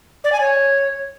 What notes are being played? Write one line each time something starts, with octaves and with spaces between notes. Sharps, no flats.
D5
G#5
C#5